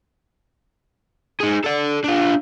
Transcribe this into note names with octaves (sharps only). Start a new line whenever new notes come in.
D#4 G#4
A4 D5
D4 F4